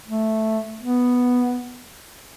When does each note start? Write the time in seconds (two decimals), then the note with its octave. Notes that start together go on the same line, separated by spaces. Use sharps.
0.08 A3
0.81 B3